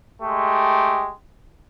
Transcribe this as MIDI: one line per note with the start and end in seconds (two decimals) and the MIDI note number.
0.22 1.11 56
0.22 1.11 57
0.22 1.11 67